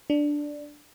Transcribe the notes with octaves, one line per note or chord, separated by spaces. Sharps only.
D4